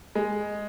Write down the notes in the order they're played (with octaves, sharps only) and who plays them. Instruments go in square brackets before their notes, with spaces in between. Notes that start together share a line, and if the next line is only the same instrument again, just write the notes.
[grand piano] G#3